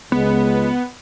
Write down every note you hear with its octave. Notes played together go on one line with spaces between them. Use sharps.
C#2 G#3 B3